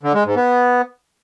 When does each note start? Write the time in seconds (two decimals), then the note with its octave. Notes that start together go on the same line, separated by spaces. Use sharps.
0.03 D3
0.14 G#3
0.25 G#2
0.36 B3